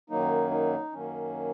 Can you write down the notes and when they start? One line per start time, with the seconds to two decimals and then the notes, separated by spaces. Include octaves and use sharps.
0.10 F#2 D#3 F#3 A#3 D#4
0.51 D#4
0.92 F#2 D#3 F#3 A#3 C#4